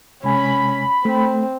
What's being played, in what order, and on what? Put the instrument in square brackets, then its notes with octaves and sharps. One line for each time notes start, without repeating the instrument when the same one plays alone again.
[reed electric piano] C3 G#3 G#5 [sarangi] C#4 [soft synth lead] B5
[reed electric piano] A3 [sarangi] C4